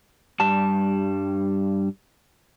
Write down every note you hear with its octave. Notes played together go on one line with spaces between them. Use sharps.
G2 G3 A5